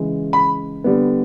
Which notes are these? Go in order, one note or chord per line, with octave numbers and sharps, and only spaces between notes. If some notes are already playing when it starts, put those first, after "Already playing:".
Already playing: C#3 E3 G#3
B5
D3 G3 B3